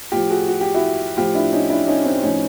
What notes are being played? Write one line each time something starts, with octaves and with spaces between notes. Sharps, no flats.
A2 F3 F4 G4
F#4 G#4
F#4
G4
E4 F#4
A2 F3 F4 G4
D4 E4
C#4 D#4
D4 E4
C#4 D#4
C4 D4
A2 F3 C#4 D#4